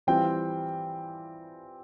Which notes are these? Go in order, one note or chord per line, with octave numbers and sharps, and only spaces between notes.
E3 G3 C4 F4 G5